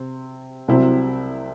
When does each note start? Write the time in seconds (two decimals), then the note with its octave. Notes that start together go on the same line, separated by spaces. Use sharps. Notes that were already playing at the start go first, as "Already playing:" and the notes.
Already playing: C3 C4
0.68 C2 C3 F#3 C4 E4